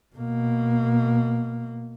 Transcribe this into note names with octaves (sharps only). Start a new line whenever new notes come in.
B2 A#3